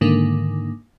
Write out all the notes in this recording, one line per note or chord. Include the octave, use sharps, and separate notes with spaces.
G#2 D3 D#3 A#3